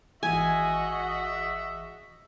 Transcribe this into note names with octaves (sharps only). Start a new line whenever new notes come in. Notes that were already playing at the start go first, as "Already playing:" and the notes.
G#1 E3 F#4 G#4 D#5 E5 G#5